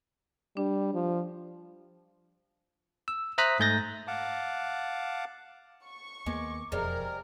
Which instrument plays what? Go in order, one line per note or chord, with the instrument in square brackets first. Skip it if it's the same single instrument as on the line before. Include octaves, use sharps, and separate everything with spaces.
[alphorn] G3 [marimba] D4
[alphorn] F3
[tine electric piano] E6
C5 E5 A#5 D#6 F#6 B6
G#2 A3 G6 A6 A#6
[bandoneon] F5 F#5 A5 D6
[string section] C#6
[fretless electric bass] D#2 A#3 B3 [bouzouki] G#3 [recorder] D6
[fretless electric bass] E1 F2 [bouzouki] C3 G3 G#3 [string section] A#4 [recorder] F6